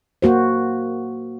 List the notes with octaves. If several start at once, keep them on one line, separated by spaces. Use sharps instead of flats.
A#3 F#4 C5